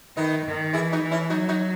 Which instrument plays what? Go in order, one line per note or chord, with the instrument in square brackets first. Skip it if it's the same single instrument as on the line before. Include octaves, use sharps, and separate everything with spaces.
[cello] D#3 [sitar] B3 D#4
[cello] D#3
[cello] E3 [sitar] E4 G#4
[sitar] D#4 F#4
[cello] E3
[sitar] C#4 E4
[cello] F#3 [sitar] D#4 F#4
[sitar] D#4 F#4